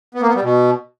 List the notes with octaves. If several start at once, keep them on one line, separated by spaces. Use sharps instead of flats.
B3
A#3
B3
G3
B2